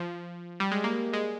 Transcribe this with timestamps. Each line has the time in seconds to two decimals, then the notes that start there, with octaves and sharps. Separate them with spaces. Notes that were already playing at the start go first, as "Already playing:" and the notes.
Already playing: F3
0.60 G3
0.71 G#3
0.84 A#3
1.13 G#3